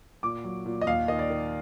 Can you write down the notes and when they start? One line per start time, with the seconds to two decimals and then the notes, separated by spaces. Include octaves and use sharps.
0.23 A#2 D6
0.44 F#3
0.66 A#2
0.81 D#5
0.87 D#2 F5
1.08 D#3 D#5
1.19 D5
1.30 D#3